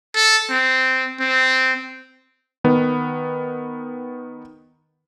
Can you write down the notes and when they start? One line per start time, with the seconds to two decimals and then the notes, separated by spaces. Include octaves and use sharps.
0.15 A4
0.50 C4
1.20 C4
2.64 D#3 B3